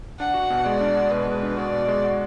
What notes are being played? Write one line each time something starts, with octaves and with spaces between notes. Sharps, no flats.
D4 F#5
F#4
B2
G#3 D5
D4
F#4
B2 B4
G#3
D4
F#4 D5
B2
G#3
F#4